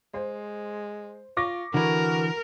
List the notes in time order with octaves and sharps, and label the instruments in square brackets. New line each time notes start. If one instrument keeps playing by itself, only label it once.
[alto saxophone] G#3 [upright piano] C5
[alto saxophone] F4 [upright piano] C#6 D6 A#6
[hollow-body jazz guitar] D3 E3 [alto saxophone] F#4 [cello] A#4